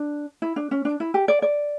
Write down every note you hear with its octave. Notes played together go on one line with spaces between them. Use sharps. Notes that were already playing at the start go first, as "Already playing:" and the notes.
Already playing: D4
E4
D4
C#4
D4
E4
G4
D5
D5